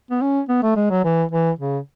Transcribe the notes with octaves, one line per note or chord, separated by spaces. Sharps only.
B3
C#4
B3
A3
G#3
F#3
E3
E3
C#3